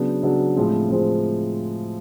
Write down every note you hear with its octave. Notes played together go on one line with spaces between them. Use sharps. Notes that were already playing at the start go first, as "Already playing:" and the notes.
Already playing: C#3 F#3 B3 D4
C#3 F#3 B3 D4
A2 F3 G#3 C4
A2 F3 G#3 C4